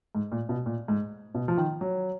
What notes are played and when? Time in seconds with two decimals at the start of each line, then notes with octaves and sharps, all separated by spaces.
0.15 G#2
0.32 A#2
0.49 B2
0.66 A#2
0.88 G#2
1.35 B2
1.48 F3
1.57 D#3
1.81 F#3